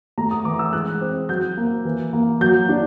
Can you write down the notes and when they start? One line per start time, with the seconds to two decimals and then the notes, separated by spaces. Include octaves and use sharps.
0.18 A3 A#5
0.31 D#6
0.45 E3 D6
0.59 E6
0.73 G#3 F#6
1.01 C4
1.29 F#3 G6
1.57 A#3
1.85 E3
2.13 A#3
2.41 F#3 G6
2.69 D4